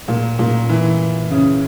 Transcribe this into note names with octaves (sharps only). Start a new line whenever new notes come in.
A#2
A#2
E3
C#3